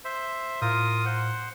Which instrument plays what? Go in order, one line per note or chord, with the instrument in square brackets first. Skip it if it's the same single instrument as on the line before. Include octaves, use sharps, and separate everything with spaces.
[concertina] C5 E5
[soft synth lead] A2 [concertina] F4 A#4 D#6
[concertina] C5 F#5